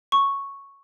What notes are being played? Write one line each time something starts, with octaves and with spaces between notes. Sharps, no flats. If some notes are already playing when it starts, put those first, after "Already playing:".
C#6